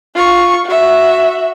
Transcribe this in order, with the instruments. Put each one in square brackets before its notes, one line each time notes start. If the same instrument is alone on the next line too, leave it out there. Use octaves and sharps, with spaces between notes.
[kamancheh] F4 C#6
F#4 E5